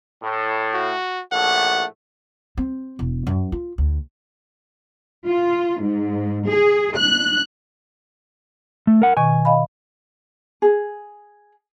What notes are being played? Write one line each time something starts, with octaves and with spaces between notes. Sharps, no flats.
A2
F#4
A#1 A2 A3 F#5
C4
E1
F#2
F4
D2
F4
G#2
G#4
F#6
A3
A#4 F#5
B2 D#3 G#5 C#6
D#5 F5 B5
G#4